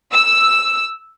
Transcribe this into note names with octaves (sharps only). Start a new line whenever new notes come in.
E6